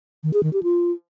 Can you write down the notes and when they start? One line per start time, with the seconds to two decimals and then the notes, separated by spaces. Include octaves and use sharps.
0.23 D#3
0.33 G#4
0.43 D#3
0.53 G4
0.63 F4